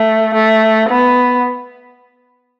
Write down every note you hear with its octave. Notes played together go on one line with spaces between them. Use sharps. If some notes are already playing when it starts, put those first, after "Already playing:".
Already playing: A3
A3
B3